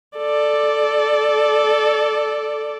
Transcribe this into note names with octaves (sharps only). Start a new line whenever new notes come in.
A4 D5